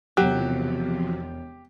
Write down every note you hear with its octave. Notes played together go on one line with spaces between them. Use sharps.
E1 E2 C3 F3 F#3 G4 F#6